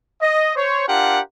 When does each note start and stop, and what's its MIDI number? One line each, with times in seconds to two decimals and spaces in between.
0.21 0.54 75
0.56 0.87 72
0.56 0.87 73
0.88 1.21 62
0.88 1.21 65
0.88 1.21 67
0.88 1.21 70
0.88 1.21 78